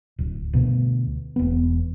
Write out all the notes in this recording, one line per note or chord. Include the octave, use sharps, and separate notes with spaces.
D1
D2 B2
E1 B3